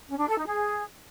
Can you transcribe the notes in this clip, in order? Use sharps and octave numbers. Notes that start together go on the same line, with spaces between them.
C#4
D4
A4
D#4
G#4